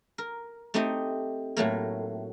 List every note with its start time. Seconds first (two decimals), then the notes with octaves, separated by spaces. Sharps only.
0.18 A#4
0.74 A3 C4 D#4 G4 D#5
1.57 A2 F#3 A3 A#3